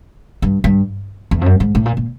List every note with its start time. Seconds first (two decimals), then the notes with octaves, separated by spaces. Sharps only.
0.42 G2
0.64 G2
1.31 E2
1.41 F2
1.46 F#2
1.60 G#2
1.75 A2
1.86 A#2
1.97 A#2